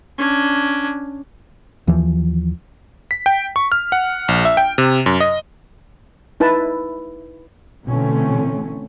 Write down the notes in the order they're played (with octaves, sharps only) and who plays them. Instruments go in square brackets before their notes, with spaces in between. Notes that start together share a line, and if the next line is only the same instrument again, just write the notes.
[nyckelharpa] C#4 D4
[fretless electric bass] D#2 E3 F3
[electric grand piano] B6
G5
C#6
F6
F#5
A#1
E5
G5
C3
F#2
D#5
[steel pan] D#4 E4 B4 A5
[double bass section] B2 D3 E3 A3 C4 C#4